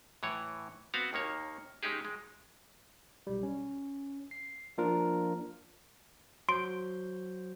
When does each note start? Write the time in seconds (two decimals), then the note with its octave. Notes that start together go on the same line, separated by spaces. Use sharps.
0.23 A2 E3 C#5
0.94 B3 C4 F#4 F5
1.13 D#2 D#3 A#3 C#5
1.83 G#3 C#4 D#4 G4 G#4
2.05 G#3
3.27 B1 G3
3.43 C#4
4.31 C7
4.78 F3 A#3 D4 F4 A#4
6.49 F#3 C5 C6 G6 D7